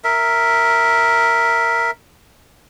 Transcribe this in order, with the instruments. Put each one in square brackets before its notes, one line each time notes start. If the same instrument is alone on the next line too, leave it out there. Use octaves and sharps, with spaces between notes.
[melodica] A#4 E5